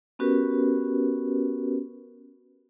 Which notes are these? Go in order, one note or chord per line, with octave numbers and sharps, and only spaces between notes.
B3 C#4 F#4 G4 A#4 B4